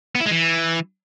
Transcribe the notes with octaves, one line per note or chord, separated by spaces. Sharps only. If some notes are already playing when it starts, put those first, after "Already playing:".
B3
E4
G#3
E3